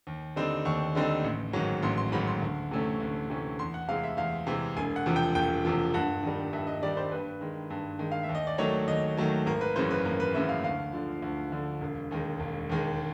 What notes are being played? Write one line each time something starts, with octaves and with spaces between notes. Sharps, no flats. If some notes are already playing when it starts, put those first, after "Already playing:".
D#2
D3 G3 C4 D#4
D#2 C#6
D3 G3 C4 D#4
A1
G#2 D#3 F#3
A1 C6
C6
G#2 D#3 F#3 B5
C6
D2
C3 E3 A3 C#4
D2
C3 E3 A3 C#4
E2 C6
F#5
C3 E3 G#3 F5
E5
E2 F5
C3 E3 G#3
E1 G#5
F#5
E2 C3 F3
G5
E1 G5
E2 C3 F3
G2 F#5
D#3 G3
G2 E5
D#5
D#3 G3 D5
C5
G2 B4
D#3 G#3
G2
D#3 G#3
F5
E5
D#2
D#5
D5
D#3 F#3 A3 C#5
D#2 D#5
D#3 F#3 A3
G#1 A#4
B4
F#2 C#3 E3 C5
B4
G#1 A#4
B4
F#2 C#3 E3 E5
F5
D2 F5
D3 F3
D2
D3 F3
E1
D#2 D#3 G#3
E1
D#2 D#3 G#3